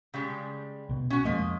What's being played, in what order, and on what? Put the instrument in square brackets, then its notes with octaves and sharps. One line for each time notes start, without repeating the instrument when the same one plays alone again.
[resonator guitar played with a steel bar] C#3 G3 G#3
[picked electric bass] C2 B2
[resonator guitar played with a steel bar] C#4 F#4
[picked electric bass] F2 G#3 A#3 [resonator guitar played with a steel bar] F3 D#5